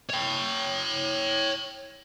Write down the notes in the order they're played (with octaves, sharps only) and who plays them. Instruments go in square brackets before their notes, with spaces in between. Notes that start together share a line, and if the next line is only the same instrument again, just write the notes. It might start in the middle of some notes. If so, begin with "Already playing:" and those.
[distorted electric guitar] C#5 G5